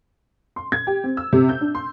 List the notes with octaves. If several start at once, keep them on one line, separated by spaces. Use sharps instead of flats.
C6
G#6
G4
C4
E6
C3
G6
D4
C6